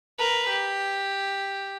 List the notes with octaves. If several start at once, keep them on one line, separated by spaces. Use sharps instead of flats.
A#4 B4
G4